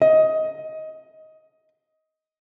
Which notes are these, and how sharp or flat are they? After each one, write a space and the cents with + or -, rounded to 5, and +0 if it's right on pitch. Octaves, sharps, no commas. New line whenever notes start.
D#5 +15